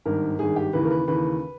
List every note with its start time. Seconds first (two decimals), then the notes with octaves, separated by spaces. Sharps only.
0.05 G#1 G2 D#3 A#4
0.39 G#1 G2 D#3 G#4
0.56 G4
0.73 D#2 C#3 E3 B4
0.85 A#4
0.91 B4
1.08 D#2 C#3 E3 B4